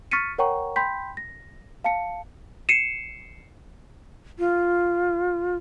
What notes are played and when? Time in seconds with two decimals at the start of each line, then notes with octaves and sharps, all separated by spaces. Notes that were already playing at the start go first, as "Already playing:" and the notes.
0.11 C#6 F6 A6 B6 C#7 D#7
0.38 A#4 C#5 F#5 G5 A#5 C#6
0.76 G5 B5 C6 G6 B6
1.17 A#6
1.84 F5 A5 C#7
2.69 C7 C#7 D#7 E7
4.39 F4